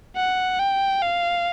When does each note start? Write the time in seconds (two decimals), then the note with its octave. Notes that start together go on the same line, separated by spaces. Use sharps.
0.17 F#5
0.59 G5
1.02 F5